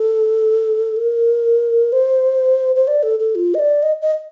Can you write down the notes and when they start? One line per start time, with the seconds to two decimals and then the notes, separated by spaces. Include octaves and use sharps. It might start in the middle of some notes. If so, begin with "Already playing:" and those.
Already playing: A4
0.97 A#4
1.92 C5
2.76 C5
2.88 D5
3.03 A4
3.20 A4
3.35 F4
3.54 D#5
3.59 D5
3.83 D#5
4.02 D#5